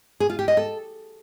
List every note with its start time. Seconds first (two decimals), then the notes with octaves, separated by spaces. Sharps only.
0.20 G#4
0.30 F4
0.39 G4
0.48 D#5
0.57 A4